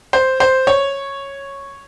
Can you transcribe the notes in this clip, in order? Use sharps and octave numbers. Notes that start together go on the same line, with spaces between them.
C5
C5
C#5